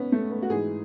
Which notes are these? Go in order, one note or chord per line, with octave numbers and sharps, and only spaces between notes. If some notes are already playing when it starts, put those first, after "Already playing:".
Already playing: G#2 B3 C#4
A3
B3
F#4
G#2 E3 G#4